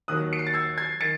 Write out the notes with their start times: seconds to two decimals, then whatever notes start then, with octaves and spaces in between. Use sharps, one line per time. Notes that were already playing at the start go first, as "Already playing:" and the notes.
0.08 D#2 D#3 F#3 D#6 F#6
0.33 C#7
0.39 C7
0.47 A6
0.54 E6 G#6
0.78 G#6 C7
1.01 D#3 A6 C#7